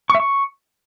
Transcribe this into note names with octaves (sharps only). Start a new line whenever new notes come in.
C#6
E5
C#6